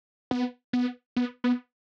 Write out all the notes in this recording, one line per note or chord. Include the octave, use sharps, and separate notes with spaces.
B3
B3
B3
B3